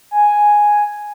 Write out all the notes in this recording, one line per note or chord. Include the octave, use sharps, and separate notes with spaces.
G#5